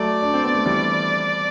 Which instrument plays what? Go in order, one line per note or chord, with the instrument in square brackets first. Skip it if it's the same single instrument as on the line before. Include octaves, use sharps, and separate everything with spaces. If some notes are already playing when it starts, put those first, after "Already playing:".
Already playing: [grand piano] F#3 A3 [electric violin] D5
[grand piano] D4
C4
B3
A3
E3 G3